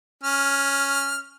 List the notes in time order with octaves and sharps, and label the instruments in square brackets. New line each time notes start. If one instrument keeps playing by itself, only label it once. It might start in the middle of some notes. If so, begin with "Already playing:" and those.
[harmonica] C#4 F6